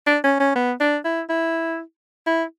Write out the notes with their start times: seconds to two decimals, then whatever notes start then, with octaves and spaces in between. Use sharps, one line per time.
0.07 D4
0.24 C#4
0.40 C#4
0.55 B3
0.80 D4
1.05 E4
1.29 E4
2.27 E4